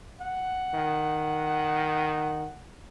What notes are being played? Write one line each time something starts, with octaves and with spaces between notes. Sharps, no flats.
F#5
D#3